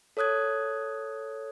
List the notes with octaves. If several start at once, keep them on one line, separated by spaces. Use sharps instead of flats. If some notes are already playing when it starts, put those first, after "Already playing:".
A4 C#5 D#6 F#6 G#6